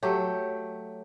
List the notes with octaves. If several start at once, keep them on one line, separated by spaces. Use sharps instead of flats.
F#3 A3 G4